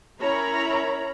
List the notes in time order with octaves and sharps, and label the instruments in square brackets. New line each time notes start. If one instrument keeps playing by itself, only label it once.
[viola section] C#4 E4 A#4 C#5 A#5 B5